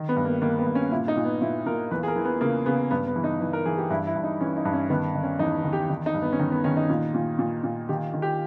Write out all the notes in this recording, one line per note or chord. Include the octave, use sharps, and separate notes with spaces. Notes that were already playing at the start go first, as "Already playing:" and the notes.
Already playing: D#3
B3
G2
A#3
D#3 A#3
B3
G2
C#4
A#2 E4
D#4
A#2
B3
A#2 E4
A#2 A#4
E2 B4
G#4
A#4
E3
B3
C#3 A#3
C#3 B3
G2 B3
B3
E3
D#4
E3
A#4
E3 G#4
G4
G2 E4
E4
G2
D#4
E3 C#4
D#4
G2
C#4
D#3 B3
D#3
C#4
E2 D#4
D#3
G4
D#3
D#4
G2
B3
C#4
D#3 D#4
B3
D#3 C#4
D#4
A#2
A#2
A#2
A#2
D#3 G4
D#3
G4